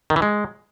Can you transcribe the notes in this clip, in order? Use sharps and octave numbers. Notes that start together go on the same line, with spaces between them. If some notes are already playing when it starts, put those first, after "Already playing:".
D#3
E3
G#3